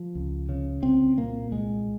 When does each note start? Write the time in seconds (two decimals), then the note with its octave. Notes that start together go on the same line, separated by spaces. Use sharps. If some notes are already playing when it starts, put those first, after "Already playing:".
Already playing: F3
0.15 C#2
0.49 C#3
0.83 C2 C4
1.17 A#2 A#3
1.51 C2 G#3